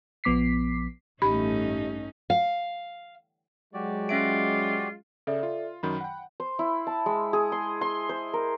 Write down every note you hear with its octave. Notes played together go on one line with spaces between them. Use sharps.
A#1 F3 B3 D6 B6 C7
A1 G2 A3 C#4 D#4 G4 B5
F5
F#3 G#3 F#4 G4 D5
C#4 F4 E5 D7
C#3 A4 D5 E5
F4
F#2 D#3 F#3 B5
F#5 G5
C5
E4
A5
G#3
G#4
C6
C6
C5
A#4